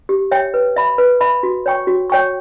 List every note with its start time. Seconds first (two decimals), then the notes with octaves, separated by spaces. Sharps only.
0.09 G4
0.31 C#5 E5 G5
0.54 B4
0.76 E5 B5
0.98 B4
1.21 E5 B5
1.43 F#4
1.66 C#5 G5 C#6
1.87 F#4
2.10 C#5 G5 C#6